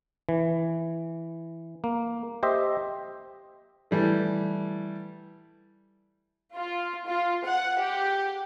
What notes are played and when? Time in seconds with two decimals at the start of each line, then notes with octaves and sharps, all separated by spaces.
0.29 E3
1.84 A#3
2.43 G4 C5 D#5 E5
3.91 E3 G3 A3
6.56 F4
7.07 F4
7.46 F#5
7.80 G4